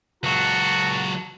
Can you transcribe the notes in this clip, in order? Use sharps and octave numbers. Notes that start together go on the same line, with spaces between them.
C#2 F#3 F#4 A5